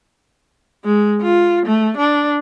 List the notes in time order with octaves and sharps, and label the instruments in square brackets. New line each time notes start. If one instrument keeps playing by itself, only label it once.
[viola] G#3
F4
A3
D4